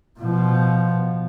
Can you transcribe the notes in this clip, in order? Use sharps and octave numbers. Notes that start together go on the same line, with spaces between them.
B2 F3